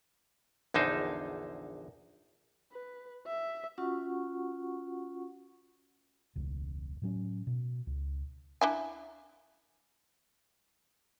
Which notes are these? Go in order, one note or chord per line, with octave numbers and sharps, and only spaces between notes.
A#1 E2 D3 D#4 C5
B4
E5
C#4 F4 F#4 F#5 C#6
E1 C#2
A2 F#3 C#4
B2
C#2
D4 E4 G#5